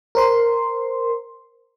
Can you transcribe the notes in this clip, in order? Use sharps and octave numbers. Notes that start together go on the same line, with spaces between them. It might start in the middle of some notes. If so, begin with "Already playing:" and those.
A#4 C5 C6